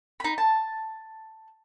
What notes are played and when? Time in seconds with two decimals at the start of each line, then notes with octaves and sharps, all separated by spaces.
0.20 D#4 B5
0.38 A5